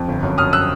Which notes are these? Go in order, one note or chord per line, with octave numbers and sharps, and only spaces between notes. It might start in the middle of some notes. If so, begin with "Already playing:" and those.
Already playing: F2
G1
F#2
F#2 D#6 F6
E6 F#6